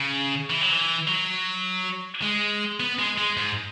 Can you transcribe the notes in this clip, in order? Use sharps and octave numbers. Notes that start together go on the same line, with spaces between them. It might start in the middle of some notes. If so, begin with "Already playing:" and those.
Already playing: C#3
E3
F#3
E3
F#3
G#3
B3
G#3
G#3
G#2